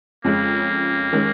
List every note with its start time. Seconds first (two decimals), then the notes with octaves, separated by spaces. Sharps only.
0.24 F2 C#3 G#3 A#3
1.12 D#3 G#3 C#4